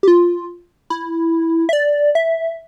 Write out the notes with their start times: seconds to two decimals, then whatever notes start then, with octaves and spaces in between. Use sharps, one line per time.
0.03 G4
0.08 F4
0.90 E4
1.69 E5
1.73 D5
2.15 E5